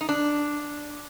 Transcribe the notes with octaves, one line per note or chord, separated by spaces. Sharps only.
D#4
D4